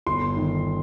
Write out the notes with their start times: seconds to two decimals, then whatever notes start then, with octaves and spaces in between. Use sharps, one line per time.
0.06 G1 C6
0.36 D#3